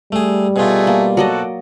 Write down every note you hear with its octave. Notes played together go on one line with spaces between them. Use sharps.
G3 A3 G#4
B2 A3 F4 G#4
A#3
F#3 F#4 A4 D5 D#5